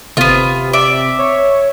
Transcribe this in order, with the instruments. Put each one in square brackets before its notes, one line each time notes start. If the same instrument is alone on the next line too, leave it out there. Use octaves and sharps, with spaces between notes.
[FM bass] G1 [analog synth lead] C3 [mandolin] B3 F4
[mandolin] D5 E5
[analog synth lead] C#5